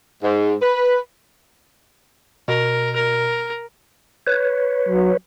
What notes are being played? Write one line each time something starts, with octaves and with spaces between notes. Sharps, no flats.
G#2
B4
B2 A#4
A#4
B4 C#5
F#3